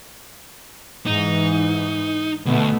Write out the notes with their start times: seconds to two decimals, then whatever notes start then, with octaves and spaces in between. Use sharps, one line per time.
1.06 G#2 E3 D#4
2.46 D2 B2 A3 B3